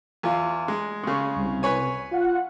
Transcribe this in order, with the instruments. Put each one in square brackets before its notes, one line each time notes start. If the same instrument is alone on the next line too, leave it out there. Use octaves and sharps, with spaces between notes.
[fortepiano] E2 F4
G#3
[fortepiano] C#3 G#3 [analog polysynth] C#6
[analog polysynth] C2
[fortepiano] B4 C#5 G#5
[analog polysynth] F4 F#5